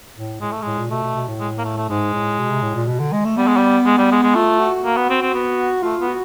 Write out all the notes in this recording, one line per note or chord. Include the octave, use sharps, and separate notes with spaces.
A2
A2 G#3
A3
A2 G#3
A#2
B2 A3
B2
B2
A2
G#3
A#3
A3
A3
G#2 G#3
A2
B2
C3
A2
A#2
B2
D3
G#3
A3
G3 B3
G#3
G3
G#3
G3
G#3
G#3
A3 F4
F#4
A#3
B3
C4
C4
B3
A3 F4
B3
F#4